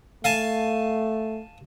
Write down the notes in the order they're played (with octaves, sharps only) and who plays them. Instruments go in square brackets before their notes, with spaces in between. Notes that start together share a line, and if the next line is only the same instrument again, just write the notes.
[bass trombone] A3 [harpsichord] F5 G#5 A5